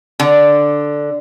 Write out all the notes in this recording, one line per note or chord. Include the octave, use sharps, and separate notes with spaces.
D3